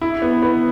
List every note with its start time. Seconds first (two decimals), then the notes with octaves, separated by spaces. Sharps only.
0.01 E4
0.22 B3
0.42 B3